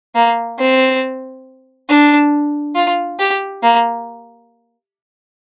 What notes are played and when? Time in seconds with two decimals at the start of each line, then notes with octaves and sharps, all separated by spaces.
0.15 A#3
0.58 C4
1.89 D4
2.75 F4
3.19 G4
3.63 A#3